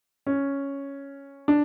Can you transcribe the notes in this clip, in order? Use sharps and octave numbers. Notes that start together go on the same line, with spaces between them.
C#4
D4